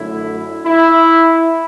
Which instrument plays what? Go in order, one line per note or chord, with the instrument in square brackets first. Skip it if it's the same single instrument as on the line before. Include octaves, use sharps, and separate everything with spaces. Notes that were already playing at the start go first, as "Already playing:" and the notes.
Already playing: [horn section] F#2 D3 A3 E4
E4